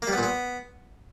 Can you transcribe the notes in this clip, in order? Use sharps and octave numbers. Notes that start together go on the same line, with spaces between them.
A#3
G3
B3
A#2
B3